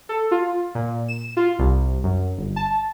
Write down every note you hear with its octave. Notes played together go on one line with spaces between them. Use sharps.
A4
F4
A#2
E7
F4
C2
F#2
G1
A5